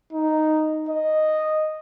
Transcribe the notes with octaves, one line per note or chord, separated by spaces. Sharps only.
D#4
D#5